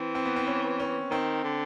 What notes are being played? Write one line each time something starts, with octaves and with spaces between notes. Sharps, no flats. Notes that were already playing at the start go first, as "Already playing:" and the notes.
Already playing: E3 C4
C4
B3
C4
C#4
C#4
D#3 C4
D3